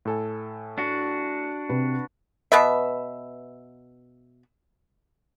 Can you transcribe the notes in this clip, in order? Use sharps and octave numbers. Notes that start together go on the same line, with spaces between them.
A2 A4 G#5
D4 F#4
C3 B4
B2 B4 E5